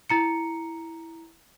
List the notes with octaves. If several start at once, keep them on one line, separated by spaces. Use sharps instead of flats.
E4 A#5 C#7